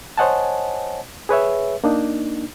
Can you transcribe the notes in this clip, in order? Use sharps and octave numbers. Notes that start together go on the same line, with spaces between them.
C5 C#5 D#5 F#5 G#5 A5
G#4 B4 C#5 E5
A#3 D4 D#4